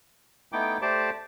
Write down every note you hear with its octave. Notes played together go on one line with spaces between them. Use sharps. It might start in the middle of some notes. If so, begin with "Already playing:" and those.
A3 B3 D#4 E4 G5 D6
A3 G4 C5 D5 A5 D6